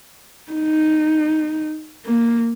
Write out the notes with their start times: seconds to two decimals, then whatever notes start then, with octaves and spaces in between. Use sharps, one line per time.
0.52 D#4
2.06 A#3